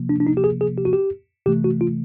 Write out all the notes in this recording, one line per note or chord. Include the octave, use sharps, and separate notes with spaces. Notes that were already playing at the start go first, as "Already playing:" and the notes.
Already playing: C3 F3 A#3
D4
D4
D#4
G4
G#4
G#4
G4
F#4
G4
C3 E3 A3 G4
F#4
F4